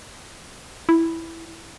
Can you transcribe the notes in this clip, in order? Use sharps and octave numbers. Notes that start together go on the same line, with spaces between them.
E4